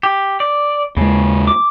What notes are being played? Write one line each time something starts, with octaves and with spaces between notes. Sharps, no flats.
G4
D5
D#2 C#3 G#3
D6